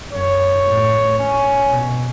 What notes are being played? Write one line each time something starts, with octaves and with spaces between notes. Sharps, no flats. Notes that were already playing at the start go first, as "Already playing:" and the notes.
F#2 C#5
A2
C#4
B2